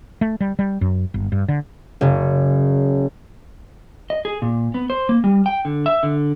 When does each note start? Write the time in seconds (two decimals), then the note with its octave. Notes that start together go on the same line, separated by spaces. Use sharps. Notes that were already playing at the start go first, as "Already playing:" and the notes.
0.21 A3
0.40 G3
0.59 G3
0.81 F#2
1.14 G1
1.32 G2
1.48 D3
2.01 F#1 C#3
4.10 D#5
4.25 G#4
4.42 A#2
4.74 B3
4.90 C5
5.09 A#3
5.24 G3
5.46 G5
5.65 D3
5.86 E5
6.03 D3